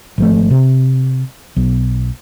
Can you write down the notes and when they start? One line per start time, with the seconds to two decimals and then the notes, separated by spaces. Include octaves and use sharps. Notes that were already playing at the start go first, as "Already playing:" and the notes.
0.18 G#1 F3 A3
0.51 C3
1.56 B1